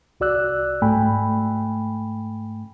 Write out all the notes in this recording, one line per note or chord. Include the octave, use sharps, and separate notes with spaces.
C2 F#4 D5 E6 F#6
G#2 A3 G5 G#5 B5